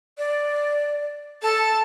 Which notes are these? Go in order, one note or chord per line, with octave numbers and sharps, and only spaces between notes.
D5
A4 A5